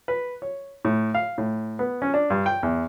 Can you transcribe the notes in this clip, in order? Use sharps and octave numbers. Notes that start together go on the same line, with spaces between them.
B4
C#5
A2
F5
A2
B3
C#4
D4
G2
G5
E2